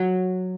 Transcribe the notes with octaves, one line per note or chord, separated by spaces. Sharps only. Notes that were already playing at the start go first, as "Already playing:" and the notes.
Already playing: F#3